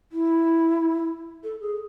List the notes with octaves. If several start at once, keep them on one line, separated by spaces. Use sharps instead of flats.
E4
A4
G#4